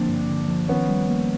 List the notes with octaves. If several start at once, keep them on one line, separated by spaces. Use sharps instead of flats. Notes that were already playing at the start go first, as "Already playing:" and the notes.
Already playing: D3 F3 A#3 C4 D4
G2
D3
F3
D#3 B3 C#4
G3
A#3